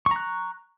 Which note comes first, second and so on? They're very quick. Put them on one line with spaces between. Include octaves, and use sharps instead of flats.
C#6 A#5 F#6